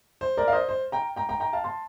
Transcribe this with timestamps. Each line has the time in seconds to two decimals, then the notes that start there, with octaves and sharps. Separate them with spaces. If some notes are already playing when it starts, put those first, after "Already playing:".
0.21 C5
0.37 A#4 D5
0.48 F5
0.52 C5 D#5
0.69 C5
0.92 G5 A#5
1.16 G5 A#5
1.29 G5 A#5
1.40 G5 A#5
1.53 F5 A5
1.64 A5 C6